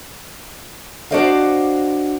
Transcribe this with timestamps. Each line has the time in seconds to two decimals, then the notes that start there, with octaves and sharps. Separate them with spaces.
1.11 D4 F#4 C5 D5 D#5 F5